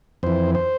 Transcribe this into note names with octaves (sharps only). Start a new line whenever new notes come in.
F2 E3 C5
C5